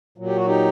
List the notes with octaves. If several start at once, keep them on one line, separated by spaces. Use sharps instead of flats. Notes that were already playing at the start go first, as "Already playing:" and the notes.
A#2 F#3
G4
F#4
D#4 G4